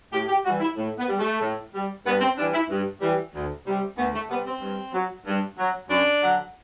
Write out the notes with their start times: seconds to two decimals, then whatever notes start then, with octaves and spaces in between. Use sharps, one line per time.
0.12 A2 G4
0.28 G4
0.44 E3 G3 F#4
0.60 E4
0.77 A2
0.98 B3
1.08 G3
1.19 A3
1.40 A2
1.73 G3
2.05 G2 B3
2.20 C4
2.38 E3 G3 D4
2.53 E4
2.69 G2
3.01 E3 G3
3.34 D2
3.66 C3 G3
3.97 D2 B3
4.14 A3
4.29 C3 G3 B3
4.46 C4
4.61 G2
4.93 F#3
5.26 G2
5.58 F#3
5.89 F#2 D4
6.22 D3 F#3